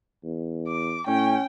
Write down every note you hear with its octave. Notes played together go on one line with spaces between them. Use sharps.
E2
D6
A2 C#4 G5